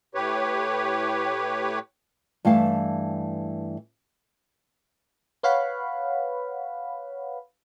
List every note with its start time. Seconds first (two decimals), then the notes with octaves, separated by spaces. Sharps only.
0.15 A2 G4 B4 C#5
2.45 G2 E3 A3 F5 A5
5.43 B4 C#5 F5 F#5 B5